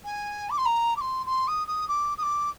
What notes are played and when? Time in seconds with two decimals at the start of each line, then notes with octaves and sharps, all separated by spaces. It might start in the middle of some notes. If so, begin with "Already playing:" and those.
0.04 G#5
0.50 D6
0.57 C6
0.65 A#5
0.96 D6
1.00 C6
1.26 C6
1.47 D#6
1.67 D#6
1.88 D6
2.17 D#6
2.22 D6